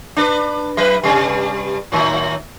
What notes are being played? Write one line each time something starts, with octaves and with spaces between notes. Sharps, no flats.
D4 A#4 B4
F#3 B4
G2 C3 G3
A2 D#3 F#3